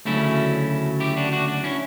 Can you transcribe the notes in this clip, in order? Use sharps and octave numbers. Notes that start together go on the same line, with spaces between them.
D2 C#3 F#3 A3 C#4 E4
E4 G4
D4 F#4
D4 F#4
D4 F#4
C#4 E4